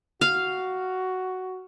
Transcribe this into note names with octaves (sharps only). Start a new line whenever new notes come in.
F#4 F5